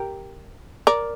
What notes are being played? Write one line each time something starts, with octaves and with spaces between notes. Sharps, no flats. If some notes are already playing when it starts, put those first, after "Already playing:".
Already playing: G4 A#4
A#4 D5